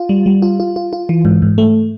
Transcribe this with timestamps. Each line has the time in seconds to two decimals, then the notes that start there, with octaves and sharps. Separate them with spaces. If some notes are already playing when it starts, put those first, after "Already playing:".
Already playing: F4
0.09 G3
0.26 G3
0.42 F4
0.60 F4
0.76 F4
0.93 F4
1.09 E3
1.25 G#2
1.42 G#2
1.58 A3